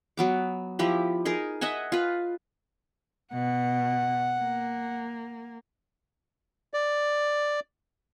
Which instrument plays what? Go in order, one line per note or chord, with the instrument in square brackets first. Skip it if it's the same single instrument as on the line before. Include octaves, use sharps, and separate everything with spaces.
[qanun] F#3 B3 D6
F3 E4 G4 B5
D#4 G#4 A#4
D#5 E5 F#5 G#5
F4 B4
[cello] B2 [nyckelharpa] F#5
[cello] A#3
[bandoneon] D5